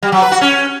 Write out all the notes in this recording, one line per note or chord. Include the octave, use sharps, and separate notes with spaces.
G3
F#3
B4
F#4
C#4